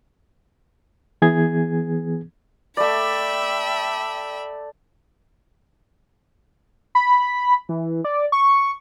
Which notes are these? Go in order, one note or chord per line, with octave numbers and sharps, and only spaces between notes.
E3 B3 G#4 G#6
A3 D5 E5 G5 B5
B5
E3
D5
C#6